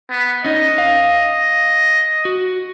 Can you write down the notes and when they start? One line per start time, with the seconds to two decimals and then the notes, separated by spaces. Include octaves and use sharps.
0.11 B3
0.45 C#4 D#4 D#5
0.78 F5
2.25 F#4